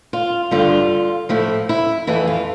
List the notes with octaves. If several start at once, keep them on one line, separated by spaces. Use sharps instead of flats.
F4
G2 D3 G3 F4
A2 F3 A3 E4
E4
F2 E3 A3 E4
F4